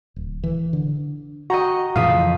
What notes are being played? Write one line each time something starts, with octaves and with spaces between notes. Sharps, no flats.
D1
E3
D3
F#4 D#5 G5 A#5
F2 A2 C#3 E3 F5 D#6 B6